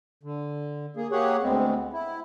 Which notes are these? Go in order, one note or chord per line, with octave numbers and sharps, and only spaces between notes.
D3
A#3 G#4
A#3 G4 G#4 C#5 F#5
D2 G#3 B3 C4
E4